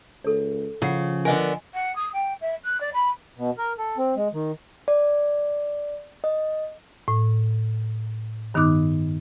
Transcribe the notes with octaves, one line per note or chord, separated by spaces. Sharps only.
C#2 A4 C#5
C#3 F3 F4 F#5
D3 B3 A#4 D#5 G#5
F#5
D#6
G5
E5
F#6
D5
B5
B2
A#4
A4
C4
G#3
D#3
D5
D#5
A2
G2 D#3 B3 D#4 D6 F#6